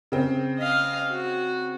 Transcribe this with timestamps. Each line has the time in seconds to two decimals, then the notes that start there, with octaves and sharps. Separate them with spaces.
0.12 C#3 C4
0.59 D#5 F5
1.10 F#4